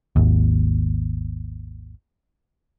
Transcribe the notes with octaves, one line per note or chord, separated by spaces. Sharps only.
G#1 D#2